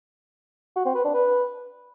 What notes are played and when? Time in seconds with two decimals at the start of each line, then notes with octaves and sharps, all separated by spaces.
0.76 F#4
0.86 C4
0.95 B4
1.05 D4
1.14 B4